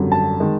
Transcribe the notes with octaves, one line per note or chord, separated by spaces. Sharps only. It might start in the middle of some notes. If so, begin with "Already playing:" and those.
Already playing: G#1 F#2 D3 G3
A5
D#3 G#3